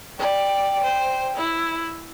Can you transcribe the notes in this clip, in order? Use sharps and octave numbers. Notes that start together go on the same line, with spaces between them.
D5 G5
C5
E4